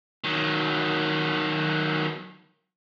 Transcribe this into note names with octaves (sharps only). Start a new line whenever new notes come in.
D#3 F#3